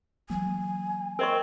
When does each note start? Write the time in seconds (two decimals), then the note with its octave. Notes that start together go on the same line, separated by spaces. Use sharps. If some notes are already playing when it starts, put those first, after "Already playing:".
0.30 E3 F#3 A#3 G#5
1.19 C4 A#4 D#5 C#6